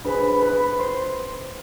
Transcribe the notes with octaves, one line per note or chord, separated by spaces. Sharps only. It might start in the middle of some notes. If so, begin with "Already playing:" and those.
D4 G#4 B4 C5 B5
B4 B5
B4 B5
C5 C6